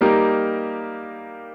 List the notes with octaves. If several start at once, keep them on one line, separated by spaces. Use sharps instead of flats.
G3 A#3 D#4 G4 A#4